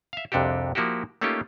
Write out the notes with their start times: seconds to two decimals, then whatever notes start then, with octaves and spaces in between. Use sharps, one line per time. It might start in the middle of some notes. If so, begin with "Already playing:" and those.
0.13 E5 F5
0.32 C2 F2 C3 D4 F#4 G4
0.75 F3 A#3 E4 F#4 G4
1.21 A3 A#3 C#4 D#4 F4 G4